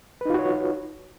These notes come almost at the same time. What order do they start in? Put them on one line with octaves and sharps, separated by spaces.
B4 D#4 F4 F#4 C#5